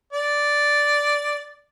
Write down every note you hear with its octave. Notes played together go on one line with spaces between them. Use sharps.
D5